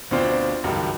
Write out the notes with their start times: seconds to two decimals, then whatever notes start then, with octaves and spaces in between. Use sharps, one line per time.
0.11 D2 B2 C4 D4 F4 C5
0.64 C#2 G2 D#3 F#3